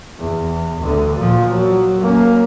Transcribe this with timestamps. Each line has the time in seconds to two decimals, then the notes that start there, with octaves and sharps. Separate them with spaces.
0.19 E2
0.81 D2 D3
1.19 A#2 F3
1.52 F#3
2.01 A#3 C#4